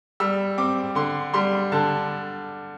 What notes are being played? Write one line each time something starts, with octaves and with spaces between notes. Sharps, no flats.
G3 E6
C4 D6
D3 C6
G3 C6
D3 A5